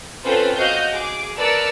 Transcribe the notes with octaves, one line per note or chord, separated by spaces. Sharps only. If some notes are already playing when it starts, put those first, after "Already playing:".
C4 C#4 F4 A4 B4 C5
F#4 D#5 F5 G6
G#4 D6
A#4 B4 D5 A5 E6 C#7